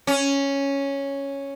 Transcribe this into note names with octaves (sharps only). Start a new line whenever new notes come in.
C#4